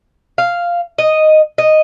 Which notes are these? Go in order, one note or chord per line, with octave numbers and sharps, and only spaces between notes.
F5
D#5
D#5